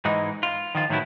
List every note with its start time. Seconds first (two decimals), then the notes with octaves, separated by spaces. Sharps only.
0.05 G#2 E3 G#3 D#4
0.43 F4
0.75 D#3 F3 F4
0.90 A2 D#3 F3 F#3 B3 E4